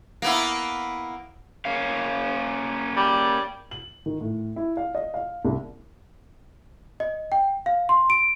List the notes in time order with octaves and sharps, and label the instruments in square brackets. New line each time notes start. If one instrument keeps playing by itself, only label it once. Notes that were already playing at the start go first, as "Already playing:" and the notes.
[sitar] A#3 B3 E4
[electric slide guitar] A#3 C#4 F5
[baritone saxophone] G3
[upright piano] F#7
D#3
A2
E4
F5
D#5
F5
C2
[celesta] D#5
G5
F5
C6
D7